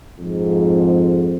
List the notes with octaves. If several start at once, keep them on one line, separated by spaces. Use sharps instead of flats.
F2 G#2